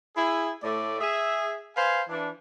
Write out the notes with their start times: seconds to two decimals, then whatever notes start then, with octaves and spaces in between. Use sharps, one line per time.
0.15 E4 G#4
0.63 A2 A3 D5
1.00 G#4 E5
1.76 B4 C5 F5 G#5
2.09 E3 D4